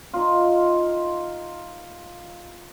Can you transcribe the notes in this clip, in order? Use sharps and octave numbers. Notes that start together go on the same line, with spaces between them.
D#4 F4